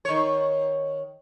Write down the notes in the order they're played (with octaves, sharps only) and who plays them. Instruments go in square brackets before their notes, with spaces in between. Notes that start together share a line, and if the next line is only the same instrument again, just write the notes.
[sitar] D#3 C#5